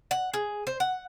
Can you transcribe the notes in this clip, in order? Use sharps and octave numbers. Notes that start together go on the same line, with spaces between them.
F#5
G#4
C5
F#5